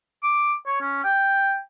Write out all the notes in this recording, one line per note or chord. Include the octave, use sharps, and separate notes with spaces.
D6
C#5
C#4
G5